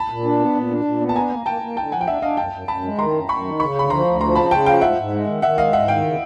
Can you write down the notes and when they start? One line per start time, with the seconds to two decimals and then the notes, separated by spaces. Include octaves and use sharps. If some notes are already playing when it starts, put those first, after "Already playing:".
Already playing: A5 B5
0.10 A#2
0.24 D4
0.39 B3
0.55 A#2
0.70 D4
0.85 A#2
1.01 B3
1.09 A5
1.16 D4 G#5 A#5
1.30 A#3
1.46 A#3 G5 A5
1.62 A#3
1.77 D3 G5 A5
1.92 F3 F#5 G#5
2.01 G5
2.07 D4 E5 F#5
2.22 D4 D#5 F5
2.37 F#2 G5 A5
2.52 F#2
2.68 F#2 A5 B5
2.84 G#3
2.98 D#3 A#5 C6
3.13 F#2
3.29 F#2 B5 C#6
3.44 D#3
3.59 C#3 B5 C#6
3.75 D2 B5
3.90 F3 A#5 C6
4.06 D2
4.21 F3 A#5 C6
4.35 C#3 A5 B5
4.51 C#3 G5 A5
4.66 F3 F5 G5
4.81 G#2 E5 F#5
4.97 G#2
5.13 G#3
5.27 D#3
5.42 D#3 E5 F#5
5.58 G#3 D#5 F5
5.73 G#2 E5 F#5
5.88 D#3 F5 G5
6.04 C#3